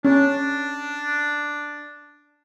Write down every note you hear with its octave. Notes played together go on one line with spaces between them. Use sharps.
C#4 D4